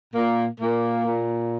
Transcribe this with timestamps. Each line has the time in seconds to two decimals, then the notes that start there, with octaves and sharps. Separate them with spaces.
0.14 A#2 A#3
0.60 A#2 A#3
1.06 A#2